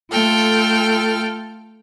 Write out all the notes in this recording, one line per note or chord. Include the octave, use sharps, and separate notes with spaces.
A3 F4 A4 G5 F6